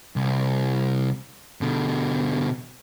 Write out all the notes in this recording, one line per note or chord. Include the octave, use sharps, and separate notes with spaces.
C2
B2 D3